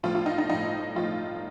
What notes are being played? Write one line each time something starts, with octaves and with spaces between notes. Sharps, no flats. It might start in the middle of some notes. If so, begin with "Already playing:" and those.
A2 F3 F4
F4
D#4
D#4
A2 F3 D#4
A2 F3 F4